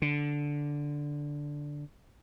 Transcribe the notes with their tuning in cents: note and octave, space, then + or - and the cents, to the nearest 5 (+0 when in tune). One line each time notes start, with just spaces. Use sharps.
D3 -5